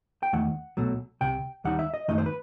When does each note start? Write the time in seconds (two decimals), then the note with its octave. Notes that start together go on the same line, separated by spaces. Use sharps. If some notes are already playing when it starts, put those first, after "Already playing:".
0.23 G5
0.33 E2 D#3 A3 F#5
0.77 B1 B2 F#3 A3
1.21 C2 C3 G5
1.64 D#2 D#3 G3 D#4 F#5
1.79 E5
1.94 D#5
2.08 F#2 D#3 A3 D#4 D#5
2.18 C5
2.26 B4